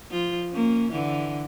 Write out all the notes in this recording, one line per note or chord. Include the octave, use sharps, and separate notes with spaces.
F3 F4
A#3 C#4
D3 E3